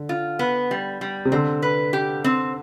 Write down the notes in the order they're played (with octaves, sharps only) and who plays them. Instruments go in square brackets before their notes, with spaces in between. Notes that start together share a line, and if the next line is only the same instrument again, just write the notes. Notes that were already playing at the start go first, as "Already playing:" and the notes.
Already playing: [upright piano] D3
[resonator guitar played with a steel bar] F4
B3
G3
G3
[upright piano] C3
[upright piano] D3 [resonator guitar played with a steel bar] C4
[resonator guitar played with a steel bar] B4
G4
C4